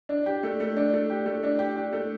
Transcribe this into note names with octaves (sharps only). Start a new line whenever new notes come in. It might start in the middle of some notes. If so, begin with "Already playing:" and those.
D4
G4
A3
A3
D4
A3
G4
A3
D4
G4
G4
A3